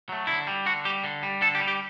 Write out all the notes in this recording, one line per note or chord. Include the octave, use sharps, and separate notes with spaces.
F#3 A3
D3 E4
G3
D3 F#4
G3 G4
D3
G3
D3 A4
G4
G3
G4